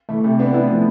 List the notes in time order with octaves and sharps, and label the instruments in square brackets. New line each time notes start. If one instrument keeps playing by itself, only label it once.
[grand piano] E3 [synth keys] A3
[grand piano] C3 [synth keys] A3
[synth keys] B3 [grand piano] D4
[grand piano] B3 [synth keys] E4
[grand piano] F3